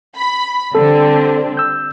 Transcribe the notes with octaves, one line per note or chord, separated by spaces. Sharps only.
B5
D3 G3 C4 A4
E6 G6